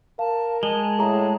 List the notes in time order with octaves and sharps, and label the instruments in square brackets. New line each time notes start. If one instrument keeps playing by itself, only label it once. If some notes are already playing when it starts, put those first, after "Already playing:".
[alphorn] A#4 [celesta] F5 [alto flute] A5
[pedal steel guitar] G#3 [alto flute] A5 [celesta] G7
[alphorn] A2 [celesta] G#4 A#5